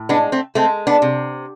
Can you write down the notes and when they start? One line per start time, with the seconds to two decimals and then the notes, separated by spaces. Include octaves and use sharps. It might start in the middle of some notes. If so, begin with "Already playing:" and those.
Already playing: A2
0.09 G#3 B3 D4
0.32 A3 C4
0.55 G#3 A3 C4
0.87 B3 D4
1.02 C3